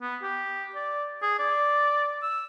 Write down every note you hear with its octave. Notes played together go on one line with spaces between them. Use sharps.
B3
G4
D5
G#4
D5
E6